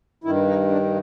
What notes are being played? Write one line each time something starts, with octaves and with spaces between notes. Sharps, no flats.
G2 D#3 E4
D#4
D4